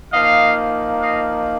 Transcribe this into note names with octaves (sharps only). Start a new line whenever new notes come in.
F3 A#3 D#4 D#5 F5
D#5 F5